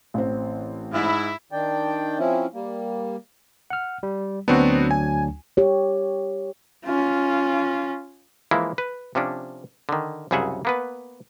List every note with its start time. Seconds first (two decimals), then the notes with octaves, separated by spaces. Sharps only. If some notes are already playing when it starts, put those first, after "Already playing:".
0.14 A1 C4
0.92 G#2 E4
1.52 D#3 D4 D5 G5
2.19 F3 C4 C#4 E4
2.54 G3 A#3
3.70 F#5 F6
4.03 G3
4.48 D2 F#3 B3 C4 D4 F#4
4.91 G#5
5.57 G4 C#5
6.86 C#4 F4
8.51 E3 F3 G#3 A#3 E4
8.78 B4
9.15 C3 F3 C#4 D4
9.89 D3 D#3
10.31 C2 F#2 C#3 G#4 E5 F#5
10.65 A#3 B3 B4